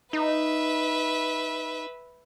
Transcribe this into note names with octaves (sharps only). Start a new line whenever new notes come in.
D#4 B4 E5